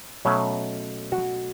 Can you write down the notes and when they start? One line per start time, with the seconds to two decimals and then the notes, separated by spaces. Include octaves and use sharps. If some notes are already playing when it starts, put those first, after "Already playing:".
0.25 B2 F#3 A3 C#4 C#5 E5
1.12 F#4